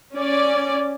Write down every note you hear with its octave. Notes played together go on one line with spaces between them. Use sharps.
C#4 D5